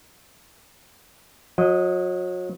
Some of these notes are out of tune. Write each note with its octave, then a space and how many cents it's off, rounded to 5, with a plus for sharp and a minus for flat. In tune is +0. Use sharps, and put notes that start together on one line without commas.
F#3 -35 D#5 +0